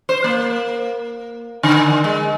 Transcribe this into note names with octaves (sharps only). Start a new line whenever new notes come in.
C5
A#3
D3
G#3